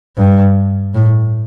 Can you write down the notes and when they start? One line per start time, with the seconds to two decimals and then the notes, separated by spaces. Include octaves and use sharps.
0.17 G2
0.95 A2